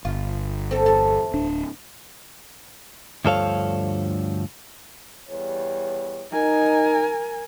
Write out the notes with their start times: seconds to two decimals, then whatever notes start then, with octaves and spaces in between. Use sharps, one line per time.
0.05 G1 F4
0.71 C4 A4
0.86 E2 A4
1.34 D1 D4
3.25 D2 G2 F3 A4 C#5 F5
5.28 E2 G3 C#5
6.32 D#4 A#4 G#5